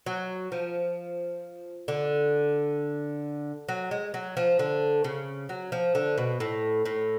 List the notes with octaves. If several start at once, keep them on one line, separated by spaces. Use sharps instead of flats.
F#3
F3
D3
F#3
G#3
F#3
F3
D3
C#3
F#3
F3
D3
B2
A2
A2